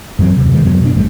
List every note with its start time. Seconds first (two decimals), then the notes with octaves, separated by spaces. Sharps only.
0.19 F#2 E3 F#3 C4
0.37 D#2 C3
0.53 D#3 G#3
0.64 F#2 F#3 B3
0.81 B2 A#3 D4
0.95 A1 G3 A3